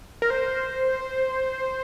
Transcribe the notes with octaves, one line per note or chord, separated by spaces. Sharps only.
A#4
C5